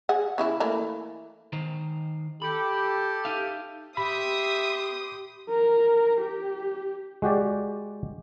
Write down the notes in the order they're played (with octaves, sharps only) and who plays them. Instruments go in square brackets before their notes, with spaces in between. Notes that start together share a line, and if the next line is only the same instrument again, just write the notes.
[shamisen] G#4 F#5
C#3 E3 E4
E3 A3 A#3
[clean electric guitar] D#3 C5 A#5
[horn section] G4 A4 [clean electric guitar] B5
[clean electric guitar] D#4 E5 F5
[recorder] G4 [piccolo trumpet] E5 [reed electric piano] B5 [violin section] C6 D#6
[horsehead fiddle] A#4
G4
[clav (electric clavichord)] G#3 F#4 G4 D5